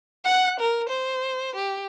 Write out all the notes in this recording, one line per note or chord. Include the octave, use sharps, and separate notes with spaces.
F#5 F#6
A#4
C5
G4